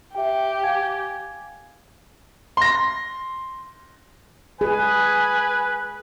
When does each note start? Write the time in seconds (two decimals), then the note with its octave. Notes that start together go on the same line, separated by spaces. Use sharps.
0.15 G4 E5 G5
0.63 F5 G#5 G#6
2.57 C6 A#6
4.61 G#4 B4 G#5